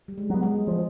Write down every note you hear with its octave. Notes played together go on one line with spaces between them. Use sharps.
G3
G#3
F#3 B3
G#3
F3